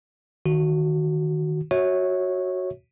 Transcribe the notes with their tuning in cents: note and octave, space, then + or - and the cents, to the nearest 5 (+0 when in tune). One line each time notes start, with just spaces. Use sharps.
D#3 -10 F#4 +0
F#4 +0 C#5 -10 E5 -25